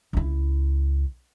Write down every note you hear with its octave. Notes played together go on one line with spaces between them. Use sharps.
C#2 E4